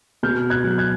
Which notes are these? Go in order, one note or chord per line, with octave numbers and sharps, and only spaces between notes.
B2 F6 G6
F#6 G#6
F#3
F#6 G#6